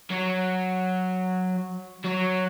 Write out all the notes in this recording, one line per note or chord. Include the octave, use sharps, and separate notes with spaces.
F#3
F#3